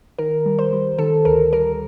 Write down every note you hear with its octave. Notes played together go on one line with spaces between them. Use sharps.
D#3 A#4
G3
C5
G3
D#3 A4
D2 A#4
G3 A#4